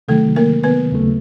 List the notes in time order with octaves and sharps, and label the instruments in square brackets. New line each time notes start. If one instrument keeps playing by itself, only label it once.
[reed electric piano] C3 D#3 F#3 [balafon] A3 A4
[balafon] A#3 A#4
B3 B4
[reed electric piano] D#2 C#3 F#3 A3